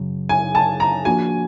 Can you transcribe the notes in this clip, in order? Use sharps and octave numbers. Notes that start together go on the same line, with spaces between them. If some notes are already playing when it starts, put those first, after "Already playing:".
Already playing: F#2 C#3 F#3
G#5
A5
A#5
F3 A#3 D4 F#4 G#5